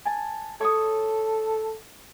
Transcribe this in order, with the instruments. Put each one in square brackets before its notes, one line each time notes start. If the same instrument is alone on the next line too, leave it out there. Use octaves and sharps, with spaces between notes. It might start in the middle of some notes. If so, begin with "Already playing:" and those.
[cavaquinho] G#5 A5
[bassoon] A4 [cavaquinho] C#5 C#6 D#6